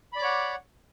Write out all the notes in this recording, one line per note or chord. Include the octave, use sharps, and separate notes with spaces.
C#5 D5 F#5 B5 D6